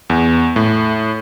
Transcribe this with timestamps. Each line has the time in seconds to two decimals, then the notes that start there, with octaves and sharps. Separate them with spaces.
0.10 E2
0.56 A2